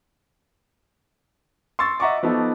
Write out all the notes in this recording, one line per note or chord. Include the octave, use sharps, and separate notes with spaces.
C6 C#6 E6 A6
D#5 E5 F#5 A#5 C#6 D6
F3 B3 D#4 A4